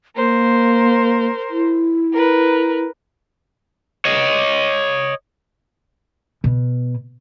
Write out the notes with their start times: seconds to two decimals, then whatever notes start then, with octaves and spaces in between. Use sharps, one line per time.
0.16 A#3 A#4 C5
1.50 E4
2.13 A#4 B4
4.05 C#5 D#5
6.44 B2